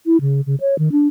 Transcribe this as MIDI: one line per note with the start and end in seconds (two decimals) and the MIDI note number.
0.06 0.17 64
0.21 0.41 49
0.46 0.55 49
0.61 0.77 73
0.79 0.89 51
0.92 1.07 62